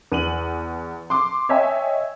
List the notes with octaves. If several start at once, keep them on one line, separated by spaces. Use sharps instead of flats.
E2 D#7 F#7
C6 D6
C#5 D#5 E5 G5 G#5